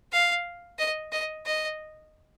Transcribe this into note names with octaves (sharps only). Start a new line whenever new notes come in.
F5
D#5
D#5
D#5